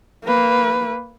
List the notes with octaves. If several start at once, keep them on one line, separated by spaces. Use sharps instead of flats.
A#3 B4